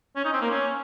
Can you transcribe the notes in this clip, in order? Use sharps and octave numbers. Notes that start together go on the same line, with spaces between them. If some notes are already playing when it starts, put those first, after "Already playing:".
C#4
D#4
C4
A#3
C#4